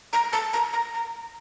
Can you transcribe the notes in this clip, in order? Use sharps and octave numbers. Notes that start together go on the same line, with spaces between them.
A#5
A5
A#5
A#5
A#5